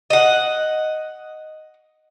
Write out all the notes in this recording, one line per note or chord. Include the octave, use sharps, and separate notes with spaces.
D#5 F#5